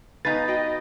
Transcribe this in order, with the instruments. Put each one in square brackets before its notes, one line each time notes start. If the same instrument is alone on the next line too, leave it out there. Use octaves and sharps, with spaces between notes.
[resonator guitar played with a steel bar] B3 D#4 B4 [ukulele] F5 G#5 A#5 [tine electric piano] A6
[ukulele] F#4 G5 [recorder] D#5